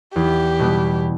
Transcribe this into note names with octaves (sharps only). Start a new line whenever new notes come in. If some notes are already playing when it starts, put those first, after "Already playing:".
E2 G4
B2 G3 B3